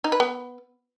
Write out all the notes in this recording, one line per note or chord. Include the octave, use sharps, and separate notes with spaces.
D#4
B4
B3